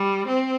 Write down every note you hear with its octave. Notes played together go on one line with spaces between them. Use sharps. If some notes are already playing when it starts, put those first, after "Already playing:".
Already playing: G3
C4